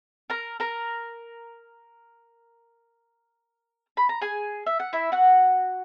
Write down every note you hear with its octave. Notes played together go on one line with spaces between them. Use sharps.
A#4 A#5
A#4 A#5
B5
A#5
G#4 G#5
E5
F#5
E4 E5
F#4 F#5